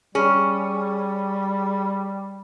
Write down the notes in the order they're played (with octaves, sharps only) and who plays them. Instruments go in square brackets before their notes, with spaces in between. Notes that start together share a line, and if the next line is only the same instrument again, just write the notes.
[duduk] G3 [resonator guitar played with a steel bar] C#4 [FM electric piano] G#4